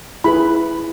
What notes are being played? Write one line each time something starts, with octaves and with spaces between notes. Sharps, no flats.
E4 G#4 B4 B5